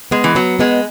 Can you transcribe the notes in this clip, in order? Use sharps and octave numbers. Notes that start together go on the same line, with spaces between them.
G#3 B3
E3
F#3 B3
G#3 B3